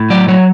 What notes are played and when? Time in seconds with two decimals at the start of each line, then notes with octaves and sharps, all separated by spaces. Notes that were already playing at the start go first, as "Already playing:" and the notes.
Already playing: A2
0.10 F#3 D5
0.28 F#3 C#5